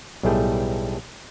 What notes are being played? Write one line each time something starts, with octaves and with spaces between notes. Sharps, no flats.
B1 A2 G3 A3 G#4 G5